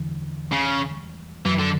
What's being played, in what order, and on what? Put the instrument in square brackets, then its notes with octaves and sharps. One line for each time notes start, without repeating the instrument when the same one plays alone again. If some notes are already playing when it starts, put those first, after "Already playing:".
Already playing: [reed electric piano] E2 D3 E3
[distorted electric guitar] C#3
[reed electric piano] F#2 F#3 [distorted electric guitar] E3
[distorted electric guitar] D3